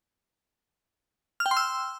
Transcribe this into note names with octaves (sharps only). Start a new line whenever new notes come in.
F6
G5
C6
E6